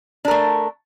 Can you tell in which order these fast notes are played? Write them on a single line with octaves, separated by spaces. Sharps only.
D4 A#4 A3